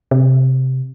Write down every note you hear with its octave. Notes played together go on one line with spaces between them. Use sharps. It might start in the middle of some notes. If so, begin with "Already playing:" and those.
C3